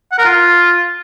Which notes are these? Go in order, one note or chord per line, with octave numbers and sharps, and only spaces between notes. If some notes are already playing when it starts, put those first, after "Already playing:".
F#5
A#4
F4